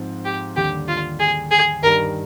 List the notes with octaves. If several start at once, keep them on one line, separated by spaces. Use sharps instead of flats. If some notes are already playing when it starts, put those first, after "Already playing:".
Already playing: G#2 F3 C4
G4
D#2 D3 G3 G4
F4
G#4
G#4
G2 D#3 G3 A#4